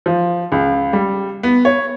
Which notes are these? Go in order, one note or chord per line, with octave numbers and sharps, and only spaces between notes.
F3
C#2
G3
B3
C#5